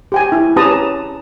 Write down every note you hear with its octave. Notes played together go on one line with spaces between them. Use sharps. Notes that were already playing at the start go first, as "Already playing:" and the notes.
G4 G5 G#5
E4
C#4 G4 B4 A5 A#5 D#6